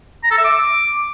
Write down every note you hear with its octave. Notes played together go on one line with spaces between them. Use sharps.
A#5
A4
E5
D6